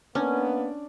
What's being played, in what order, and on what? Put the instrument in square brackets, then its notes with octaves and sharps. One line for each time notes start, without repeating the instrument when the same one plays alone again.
[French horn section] A#3 B3 [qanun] C#4 [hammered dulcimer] D4